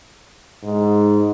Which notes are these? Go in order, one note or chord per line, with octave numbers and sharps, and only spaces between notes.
G#2